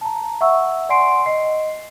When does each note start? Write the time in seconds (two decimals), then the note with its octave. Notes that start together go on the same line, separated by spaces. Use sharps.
0.01 A5 A#5
0.41 E5 F#5 C#6 E6
0.89 D5 F#5 G#5 C6 C7 D7
1.26 D#5 C7